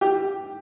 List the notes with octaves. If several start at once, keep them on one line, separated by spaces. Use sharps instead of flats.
G4